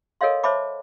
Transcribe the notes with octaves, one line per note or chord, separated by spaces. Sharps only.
A4 A#4 C#5 D#5 F5 C6
C5 C#5 E5 A5 B5 D6